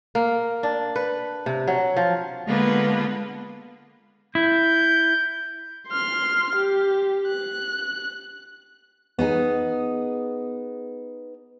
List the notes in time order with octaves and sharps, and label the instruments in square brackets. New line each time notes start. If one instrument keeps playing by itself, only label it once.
[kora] A#3
D4
B4
C3
F#3
F3
[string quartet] D3 G#3 A#3 B3 F4 B4
[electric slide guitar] E4 [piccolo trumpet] G6
[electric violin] C6 F6
G4
F#6
[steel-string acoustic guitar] B3 D#4 G#4